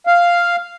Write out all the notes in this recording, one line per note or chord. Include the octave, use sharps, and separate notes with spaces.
F5